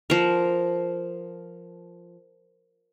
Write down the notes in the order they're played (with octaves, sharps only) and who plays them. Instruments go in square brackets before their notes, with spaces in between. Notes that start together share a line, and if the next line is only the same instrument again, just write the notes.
[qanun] F3 A#4